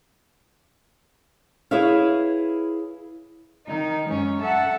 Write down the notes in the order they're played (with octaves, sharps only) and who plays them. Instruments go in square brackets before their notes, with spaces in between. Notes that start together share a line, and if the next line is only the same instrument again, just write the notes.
[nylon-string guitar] E4 G#4 B4 C#5 E5 F5
[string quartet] D#3 D#4
F#2 G#3 C#4
A4 E5 F#5 A5